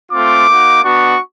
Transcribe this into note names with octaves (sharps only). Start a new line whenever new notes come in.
A3 C4 F4 D6
A#3 D#4 F#4
B3 D4 F#4 C#6